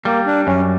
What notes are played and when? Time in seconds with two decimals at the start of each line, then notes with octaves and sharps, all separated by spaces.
0.05 G3 A#3
0.26 D4
0.47 F#2 C#4